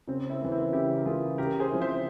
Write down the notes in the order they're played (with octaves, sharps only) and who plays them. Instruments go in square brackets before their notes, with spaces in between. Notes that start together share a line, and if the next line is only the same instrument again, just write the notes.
[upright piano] C#3 [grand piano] C4
[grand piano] C4 E4
[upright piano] E3 A#3
[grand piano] C4 E4
[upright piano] C#3 [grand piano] E4 G4
[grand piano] A#4
[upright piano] E3 A#3 [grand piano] F4 G#4
[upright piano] C#3 [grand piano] G4 A#4
[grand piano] G#4 C5
[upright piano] F3 C4 E4
[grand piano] C5 E5